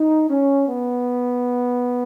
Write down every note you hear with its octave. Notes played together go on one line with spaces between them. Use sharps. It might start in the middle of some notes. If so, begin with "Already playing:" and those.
Already playing: D#4
C#4
B3